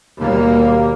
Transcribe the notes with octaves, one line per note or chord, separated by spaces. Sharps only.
D#2 B2 G3 A#3